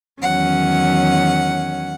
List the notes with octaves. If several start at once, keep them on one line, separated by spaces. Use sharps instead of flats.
E2 D#3 F#3 C#4 F#5